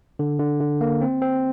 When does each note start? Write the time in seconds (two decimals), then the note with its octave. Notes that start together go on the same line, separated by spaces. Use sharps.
0.19 D3
0.39 D3
0.61 D3
0.81 A#3
1.01 C4
1.22 C4